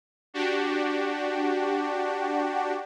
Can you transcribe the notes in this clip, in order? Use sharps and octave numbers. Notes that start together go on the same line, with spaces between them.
D4 F#4 G4